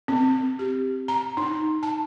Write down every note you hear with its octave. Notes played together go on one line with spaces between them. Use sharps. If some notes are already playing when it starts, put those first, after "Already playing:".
C4
G4
A#5
D#4
A5